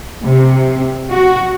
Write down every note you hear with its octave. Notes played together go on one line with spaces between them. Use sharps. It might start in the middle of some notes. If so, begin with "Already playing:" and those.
C3
F#4